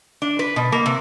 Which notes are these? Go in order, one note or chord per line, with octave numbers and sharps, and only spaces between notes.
D4
B4
B2
A#3
C3